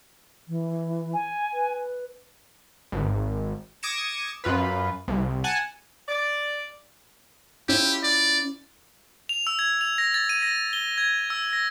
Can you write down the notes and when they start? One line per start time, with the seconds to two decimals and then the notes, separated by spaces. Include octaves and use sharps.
0.48 E3
1.14 G#5
1.54 B4
2.92 G#1
3.83 D6 D#6 G#6 A#6 C#7 E7
4.44 F#2 F4 B4
5.08 C2
5.44 F#5 G#5 A5 F#6
6.09 D5
7.69 C#4 E4 F4 G4
8.04 D5
9.29 F7
9.47 E6
9.59 G#6
9.81 F7
9.98 A#6
10.14 A6
10.29 D#7
10.42 A#6
10.73 G7
10.98 G#6
11.30 E6
11.53 A#6